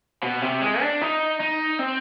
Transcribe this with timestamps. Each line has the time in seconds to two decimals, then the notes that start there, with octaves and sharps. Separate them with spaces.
0.23 B2
0.42 C3
0.61 G#3
0.81 D4
1.01 D#4
1.40 D#4
1.79 C4